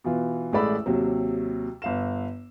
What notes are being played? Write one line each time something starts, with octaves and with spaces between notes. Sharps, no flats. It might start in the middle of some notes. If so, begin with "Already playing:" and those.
B2 E3 F4
A1 G#3 A3 D5 B5 E6
D#2 C3 F#3
G1 F5 E7